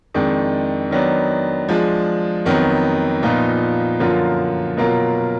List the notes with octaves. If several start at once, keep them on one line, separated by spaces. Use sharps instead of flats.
F2 D#3 G#3 D4
D#3 F#3 B3 D4
F3 G#3 D4
F2 D#3 F#3 B3
A#2 F3 B3 D#4
F#2 D3 F3 A#3 F4
B2 F#3 A#3 F4 A#4